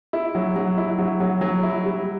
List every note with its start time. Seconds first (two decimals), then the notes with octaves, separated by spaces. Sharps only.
0.13 E4
0.35 F#3
0.56 F#3
0.78 E4
0.99 F#3
1.20 F#3
1.41 F#3
1.63 E4
1.84 G3